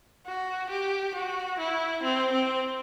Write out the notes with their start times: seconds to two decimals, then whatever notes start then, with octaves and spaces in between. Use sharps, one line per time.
0.26 F#4
0.70 G4
1.15 F#4
1.59 E4
2.03 C4
2.32 C4